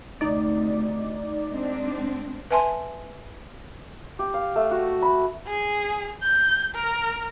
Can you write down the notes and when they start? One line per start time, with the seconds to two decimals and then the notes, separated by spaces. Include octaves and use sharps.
0.21 D2 C3 D#4 D5
1.50 G#3 C4 D4
2.51 B4 E5 G#5 A5 C6
4.19 G4
4.34 F5
4.56 A3
4.71 F#4
5.02 B5
5.47 G#4
6.23 G6
6.75 A#4